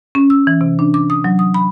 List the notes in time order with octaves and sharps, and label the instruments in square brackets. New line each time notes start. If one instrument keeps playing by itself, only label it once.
[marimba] C#4
E6
E3
C3
D4
D6
D#6
F#3
D#6
B5